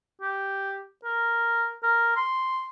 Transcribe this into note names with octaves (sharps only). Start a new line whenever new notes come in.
G4
A#4
A#4
C6